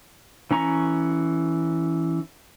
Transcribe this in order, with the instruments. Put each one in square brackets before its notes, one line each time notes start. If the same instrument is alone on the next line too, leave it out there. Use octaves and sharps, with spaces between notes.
[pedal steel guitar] E3 C#4 A#5 C#6